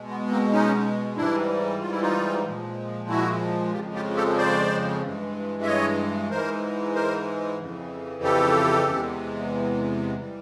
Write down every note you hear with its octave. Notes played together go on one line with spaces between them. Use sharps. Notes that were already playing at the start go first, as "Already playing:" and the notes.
Already playing: B2 G#3
B3
A#3 C4
C#4 D#4
G#2 E3 G3 D4 E4
F4
E4
D#4 F4
A#2 F3 G#3
E4 F#4
F2 C#3 F3 G#3 F4 G4
F4 G4
G4 A4
C5 D5
G2 E3 G#3
E5
C#5 D#5
G#2 E3 G#3 A#4 C5
A#4 C5
F2 C#3 E3
G4 A4
E2 C3 E3 G#3
E3 G3